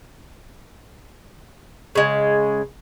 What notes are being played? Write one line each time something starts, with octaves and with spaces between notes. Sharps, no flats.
C#3 G#3